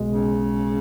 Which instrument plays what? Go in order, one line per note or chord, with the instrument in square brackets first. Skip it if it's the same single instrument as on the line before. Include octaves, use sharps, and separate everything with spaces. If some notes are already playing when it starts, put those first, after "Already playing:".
Already playing: [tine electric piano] B1 B2 G#3
[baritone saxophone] C#3